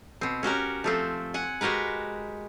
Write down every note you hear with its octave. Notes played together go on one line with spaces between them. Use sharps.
B2 C4
C#4 F#4 G4 A#4
F3 A3 C4
F#5 G#5
G#3 F#4 G4 A#4 B4